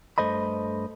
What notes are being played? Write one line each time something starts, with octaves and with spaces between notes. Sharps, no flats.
G2 A3 C5 D#5 B5